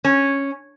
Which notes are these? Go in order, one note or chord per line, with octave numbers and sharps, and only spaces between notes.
C#4